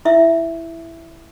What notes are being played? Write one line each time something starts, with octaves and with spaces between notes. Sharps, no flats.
E4 E5